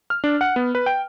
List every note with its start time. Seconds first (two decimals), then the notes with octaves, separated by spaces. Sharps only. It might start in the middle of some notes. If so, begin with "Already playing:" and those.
0.10 F6
0.24 D4
0.41 F#5
0.56 B3
0.75 B4
0.86 G5